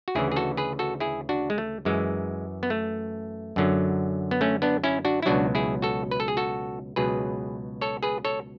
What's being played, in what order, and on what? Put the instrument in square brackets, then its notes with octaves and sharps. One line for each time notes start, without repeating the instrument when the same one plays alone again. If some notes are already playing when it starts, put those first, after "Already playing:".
[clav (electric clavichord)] F#4
D2 C#3 E3 E4 G#4
G#4
F#4 A4
G#4 B4
F#4 A4
E4 G#4
D4 F#4
G#3
A3
F#2 E3 G#3
B3
A3
F#2 D3 F#3
B3
A3 C#4
B3 D4
C#4 E4
D4 F#4
E4
C#2 B2 F#3 D4 F#4
E4 G#4
F#4 A4
B4
A4
G#4
F#4 A4
C#2 B2 F#3 G#4 B4
A4 C#5
G#4 B4
A4 C#5